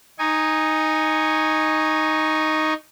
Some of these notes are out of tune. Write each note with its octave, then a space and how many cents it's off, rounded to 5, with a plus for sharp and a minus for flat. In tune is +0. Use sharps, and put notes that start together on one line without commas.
D#4 +0 G#5 -15 C#6 +0